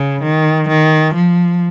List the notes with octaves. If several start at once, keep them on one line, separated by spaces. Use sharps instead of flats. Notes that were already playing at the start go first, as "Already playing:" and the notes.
Already playing: C#3
D#3
D#3
F3